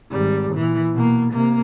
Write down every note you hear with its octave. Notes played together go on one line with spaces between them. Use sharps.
G#1 G3
A#2 E3
B2 A#3
C3 A#3